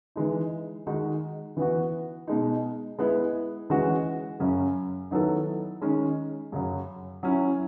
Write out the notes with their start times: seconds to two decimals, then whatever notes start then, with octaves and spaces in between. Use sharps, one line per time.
0.16 E3 G#3 D#4
0.87 D#3 G#3 D#4 F#4
1.57 E3 B3 F#4
2.27 B2 G#3 D#4
2.99 G#3 B3 E4
3.70 E3 G#3 C#4 F#4
4.40 F#2 C#3 F#3 C#4
5.11 D#3 F#3 B3 E4 A4
5.82 D#3 G#3 C#4
6.52 F#2 C#3 F#3
7.23 F#3 C#4 E4